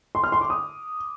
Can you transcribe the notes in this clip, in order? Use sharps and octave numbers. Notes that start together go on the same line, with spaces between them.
C6
F6
C6
D6
D#6